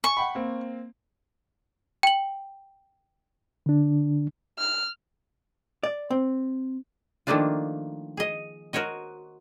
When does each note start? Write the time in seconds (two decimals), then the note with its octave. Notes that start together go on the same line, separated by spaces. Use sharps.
0.04 G#5 C#6
0.17 F#5 G5 B5
0.35 A#3 C4
2.03 G5 F#7
3.66 D3 D4
4.58 F6
5.83 D5
6.10 C4
7.27 D#3 F3 A3 A#3 D4 F4
8.17 G#4 D#5
8.73 F#4 A#4 C5 C#5 D#5